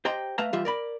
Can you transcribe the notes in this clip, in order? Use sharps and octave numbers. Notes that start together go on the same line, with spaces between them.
G4 C5 D#5 G5 A#5 C6
A3 B4 E5 F5 A5 A#5
E3 G3 F4 G4 E5
A#4 D5 B5